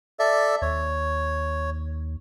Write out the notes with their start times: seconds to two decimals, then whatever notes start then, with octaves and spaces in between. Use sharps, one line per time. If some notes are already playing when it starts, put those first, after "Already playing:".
0.19 A4 D5 E5
0.62 D#2 C#5